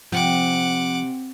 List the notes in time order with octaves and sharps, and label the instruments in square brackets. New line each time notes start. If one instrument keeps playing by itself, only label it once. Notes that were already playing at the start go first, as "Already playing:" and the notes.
[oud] C3 [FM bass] F3 [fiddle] F#5 D6